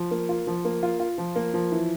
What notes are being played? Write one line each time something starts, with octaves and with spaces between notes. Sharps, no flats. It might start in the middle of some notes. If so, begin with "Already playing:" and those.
Already playing: F3
A#3
F4
F3
A#3
F4
F4
F3
A#3
F3
E3